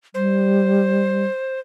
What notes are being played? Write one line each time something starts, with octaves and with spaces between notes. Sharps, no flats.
G3 C5